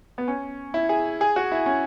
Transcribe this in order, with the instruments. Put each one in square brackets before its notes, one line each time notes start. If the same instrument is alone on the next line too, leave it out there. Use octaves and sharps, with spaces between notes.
[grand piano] B3
C#4
E4
G#4
G#4
F#4
E4
C#4